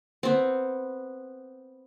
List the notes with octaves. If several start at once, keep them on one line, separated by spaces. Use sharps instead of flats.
B3 C4